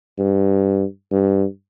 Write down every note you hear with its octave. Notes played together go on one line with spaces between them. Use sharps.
G2
G2